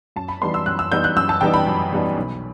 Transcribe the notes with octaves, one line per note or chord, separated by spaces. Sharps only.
F#2 A5
B5
E3 G3 B3 D#4 C6
E6
F#2 F#6
E6
E3 G3 B3 D#4 G6
F#6
F#2 E6
A5
E3 G3 B3 D#4 G5
B5
F#2
E3 G3 B3 D#4
B1